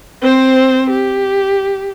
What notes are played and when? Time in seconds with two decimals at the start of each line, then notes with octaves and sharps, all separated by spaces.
0.22 C4 C5
0.90 G4